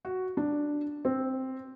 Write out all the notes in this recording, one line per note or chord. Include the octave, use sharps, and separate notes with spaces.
F#4
D4
C4